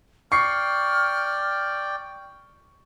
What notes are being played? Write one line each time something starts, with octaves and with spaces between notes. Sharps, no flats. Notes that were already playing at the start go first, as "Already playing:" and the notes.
D5 G5 C#6 F6 C7